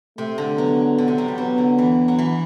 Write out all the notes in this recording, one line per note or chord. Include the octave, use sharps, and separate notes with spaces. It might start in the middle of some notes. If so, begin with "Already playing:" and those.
C3 A3
D3
F#3 B3
D3
C3
F#3
G3
F#3 B3
D3
E3
F#3
E3